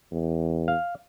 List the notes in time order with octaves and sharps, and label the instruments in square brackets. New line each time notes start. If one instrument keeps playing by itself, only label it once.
[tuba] E2
[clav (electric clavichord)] F5